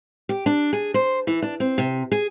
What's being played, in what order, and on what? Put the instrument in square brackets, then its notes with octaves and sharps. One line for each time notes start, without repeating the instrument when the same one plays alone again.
[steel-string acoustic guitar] G4
D4
G#4
C5
E3
D4
C4
C3
G#4